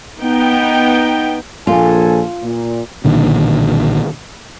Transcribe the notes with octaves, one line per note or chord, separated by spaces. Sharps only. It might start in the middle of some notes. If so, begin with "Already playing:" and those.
B3 D#4 G5
A#1 F4 A4 G#5
A#2
B1 A#2 D3 D#3